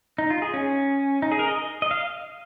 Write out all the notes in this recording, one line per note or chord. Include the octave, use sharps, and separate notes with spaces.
D#4
F4
G#4
C#4
D#4
G#4
A#4
D#5
D#5
F5